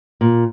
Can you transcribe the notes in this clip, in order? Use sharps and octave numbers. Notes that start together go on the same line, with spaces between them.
A#2